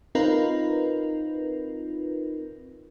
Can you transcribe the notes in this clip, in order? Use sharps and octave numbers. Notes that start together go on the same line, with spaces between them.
C4 D#4 F4 A#4 B4